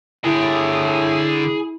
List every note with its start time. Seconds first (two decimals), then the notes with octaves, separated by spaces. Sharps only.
0.24 A2 D3 E4 G4 G#4